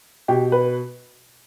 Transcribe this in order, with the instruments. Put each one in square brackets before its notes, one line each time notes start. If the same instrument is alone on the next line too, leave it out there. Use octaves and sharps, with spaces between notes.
[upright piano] B2 G4
B4